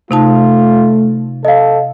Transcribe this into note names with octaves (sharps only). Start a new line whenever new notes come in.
C3 A3 D#4 F4 A5
A4 D#5 F5